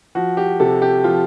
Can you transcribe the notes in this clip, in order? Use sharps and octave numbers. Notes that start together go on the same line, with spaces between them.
F3 F#4
G4
C3 A4
G4
F3 F4